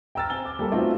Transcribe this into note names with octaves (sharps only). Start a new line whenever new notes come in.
G5 A#5 E6 F6 A6
C4 G#5 G7
D6
G3 A#3 A4
A3 B3 C4 D#4 F4 F#4